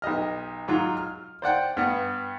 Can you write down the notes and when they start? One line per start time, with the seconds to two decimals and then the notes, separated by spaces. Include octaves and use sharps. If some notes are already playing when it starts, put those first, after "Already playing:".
0.02 B1 G4 D#5 F6
0.68 G#2 F#3 F4
0.97 F6
1.42 C5 D5 F#5 G5
1.77 G2 B3 F#5